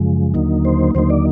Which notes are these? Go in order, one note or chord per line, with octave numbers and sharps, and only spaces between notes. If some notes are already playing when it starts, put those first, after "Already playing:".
Already playing: F#2 C#3 F3 G#3
D#2 D3 F#3 A#3 D#4
C5
D#2 D3 F#3 A#3 D#4 C5
D5